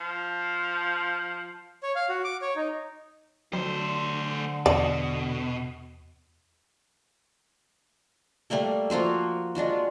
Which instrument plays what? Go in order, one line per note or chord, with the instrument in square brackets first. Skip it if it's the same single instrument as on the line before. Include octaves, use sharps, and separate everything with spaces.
[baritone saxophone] F3
[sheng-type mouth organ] C#5
F5
F#4
D6
C#5
D#4
[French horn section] D3 [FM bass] F#3 [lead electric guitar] A3 C5
[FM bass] E2 [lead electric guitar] B2 [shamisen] D5
[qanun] G3 A3 A#3 A4
F3 A#3 F4 F#4
G#3 D4 F4 F#4